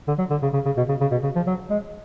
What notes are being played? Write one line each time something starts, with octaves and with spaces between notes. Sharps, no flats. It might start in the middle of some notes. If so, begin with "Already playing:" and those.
D3
F#3
D3
C#3
C#3
C#3
B2
C#3
C#3
B2
C#3
F3
F#3
G#3